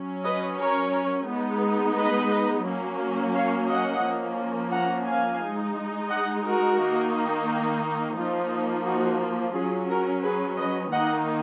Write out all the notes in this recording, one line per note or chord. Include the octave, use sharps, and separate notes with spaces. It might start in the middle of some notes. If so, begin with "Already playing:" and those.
Already playing: F#3 C#4
B4 D#5
A#4 C#5
G#3 B3 D#4
B4 D#5
F#3 A#3 C#4
C#5 F5
D#5 F#5
F3 A#3 C#4
F#5 A#5
F5 G#5
G#3 D#4
D#5 F#5
F#4 A#4
D#3 A#3 D#4
F3 A#3 D#4 F4
D#4 F#4
F#3 C#4 F4 G#4
F#4 A#4
G#4 B4
B4 D#5
D#3 A#3 D#4 D#5 F#5